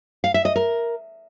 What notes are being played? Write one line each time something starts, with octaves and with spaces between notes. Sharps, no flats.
F5
E5
D#5
A#4